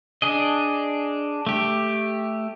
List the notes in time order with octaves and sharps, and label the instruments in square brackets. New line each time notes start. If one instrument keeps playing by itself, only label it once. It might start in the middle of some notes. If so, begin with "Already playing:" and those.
[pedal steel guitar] D4 G#4 D#5
A3 G4